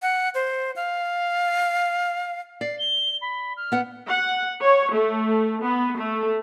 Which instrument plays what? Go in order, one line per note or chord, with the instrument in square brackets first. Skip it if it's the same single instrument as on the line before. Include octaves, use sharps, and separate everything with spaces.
[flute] F#5
C5
F5
[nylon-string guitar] D5 [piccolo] C7
[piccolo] G7
B5
F6
[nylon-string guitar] B3 F#5
[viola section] F#5
C#5
A3
B3
A3